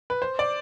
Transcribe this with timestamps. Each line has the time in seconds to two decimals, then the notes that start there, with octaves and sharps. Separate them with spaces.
0.10 B4
0.22 C5
0.39 D5